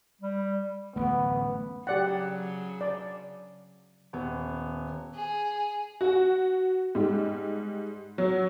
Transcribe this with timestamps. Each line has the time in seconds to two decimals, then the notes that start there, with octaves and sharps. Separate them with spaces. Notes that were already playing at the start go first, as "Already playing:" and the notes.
0.21 G3
0.96 D1 A1 F#2 A3 B3
1.87 C#3 F#3 G4 D5 F#5
2.81 D5
4.13 D#1 B3
5.14 G#4
6.01 F#4
6.95 G#2 G3
8.18 F#3